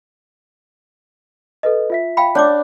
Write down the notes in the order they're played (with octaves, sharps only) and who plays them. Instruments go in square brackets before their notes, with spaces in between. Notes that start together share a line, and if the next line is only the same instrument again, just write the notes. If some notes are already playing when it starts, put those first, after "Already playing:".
[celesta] A4 B4 D#5
F4 E5 B6
[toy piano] F5 G5 B5
[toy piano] C#4 C#5 D6 [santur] D4